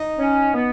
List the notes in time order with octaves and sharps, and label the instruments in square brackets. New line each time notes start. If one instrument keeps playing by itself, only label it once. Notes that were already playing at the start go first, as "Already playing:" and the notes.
Already playing: [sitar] D#4
[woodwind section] C#4
B3